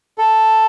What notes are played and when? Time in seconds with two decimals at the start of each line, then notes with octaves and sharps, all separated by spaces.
0.18 A4